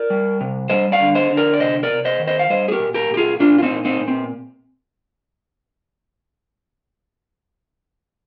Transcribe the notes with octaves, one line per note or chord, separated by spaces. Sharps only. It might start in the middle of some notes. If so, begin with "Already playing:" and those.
Already playing: A#4 D5
G3
C3
G3 C5 D#5
D5 F5
D3
C5 D#5
D3
A#4 D5
D5
C3 C5 D#5
A#4 D5
C3
C5 D#5
D#3
C5 D#5
F5
G3 C5 D#5
G#4
G4 A#4
A#2
G4 A#4
A#2 G4
F4 G#4
A#2 D4 F4
F4
C4 D#4
A#2
C4 D#4
A#2
C4